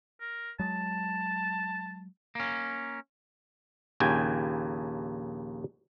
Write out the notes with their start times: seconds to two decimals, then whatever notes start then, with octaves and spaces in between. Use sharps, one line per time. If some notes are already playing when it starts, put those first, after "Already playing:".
0.20 A#4
0.59 F#3 G#3 A5
2.35 A#3 C#4
4.00 A#1 D#2 C#3 G5 G#5